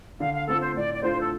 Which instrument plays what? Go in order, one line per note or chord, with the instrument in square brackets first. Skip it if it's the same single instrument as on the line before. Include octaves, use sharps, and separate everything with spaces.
[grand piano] D3 [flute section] F5
[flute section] F5
[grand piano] A3 C4 F4 [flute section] A4
[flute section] C5
[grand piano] A2 [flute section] D5
[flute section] D5
[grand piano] A3 D4 F4 [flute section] C5
[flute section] A4